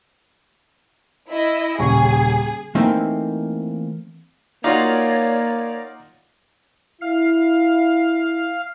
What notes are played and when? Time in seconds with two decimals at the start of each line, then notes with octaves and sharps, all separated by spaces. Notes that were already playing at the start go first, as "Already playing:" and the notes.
1.29 E4 D#5
1.79 D#1 C#3 G#4 G#5 C#6
2.75 E3 A3 A#3 C4 D#4 E5
4.64 A#3 D#4 F4 F#4 C#5 D5 F5 A#5
7.01 E4 F5